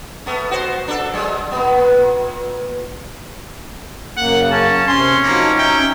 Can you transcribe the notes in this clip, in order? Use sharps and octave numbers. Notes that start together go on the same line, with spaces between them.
A3 B3
F#4 C5
D4 A4
F#3 G#3
A#2 B3
F#2 C#3 A#3 F#5
C#4 A5
C3 C#4 C6
F3 F#3 A#3 D#4
D#4 E5 G5